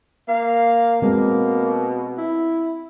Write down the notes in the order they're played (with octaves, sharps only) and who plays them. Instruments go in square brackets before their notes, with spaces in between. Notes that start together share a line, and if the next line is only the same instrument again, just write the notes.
[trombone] A#3 [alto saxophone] F5
[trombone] B2 [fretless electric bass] G#3 C4 [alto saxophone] A#3
[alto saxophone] E4